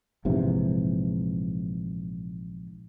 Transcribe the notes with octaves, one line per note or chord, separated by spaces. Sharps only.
A#1 G#2 C3 E3